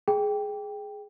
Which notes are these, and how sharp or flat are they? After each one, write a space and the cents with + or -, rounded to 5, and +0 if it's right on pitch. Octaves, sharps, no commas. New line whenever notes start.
G#4 +10 G5 +5